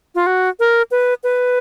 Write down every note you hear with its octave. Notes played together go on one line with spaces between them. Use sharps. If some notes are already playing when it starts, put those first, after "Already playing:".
F4
F#4
A#4
B4
B4